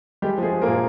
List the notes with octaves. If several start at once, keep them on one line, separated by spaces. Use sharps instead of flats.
G3 G#3 G4
F3
G#3 G#4
F3
A#3 A#4
A#2